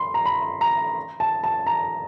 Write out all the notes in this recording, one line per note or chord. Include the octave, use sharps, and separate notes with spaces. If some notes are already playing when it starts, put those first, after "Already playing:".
Already playing: B5 C6
A#5
B5
A#5
A5
A5
A#5